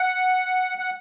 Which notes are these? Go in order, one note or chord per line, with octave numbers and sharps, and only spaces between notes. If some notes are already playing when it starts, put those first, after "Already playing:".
Already playing: F#5
F#5